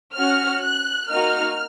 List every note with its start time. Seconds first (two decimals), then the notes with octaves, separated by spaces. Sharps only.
0.14 C#4 F#4 F6
0.62 F#6
1.09 A#3 D#4 F#4 F6